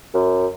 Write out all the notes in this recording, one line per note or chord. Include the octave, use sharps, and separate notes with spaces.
F#2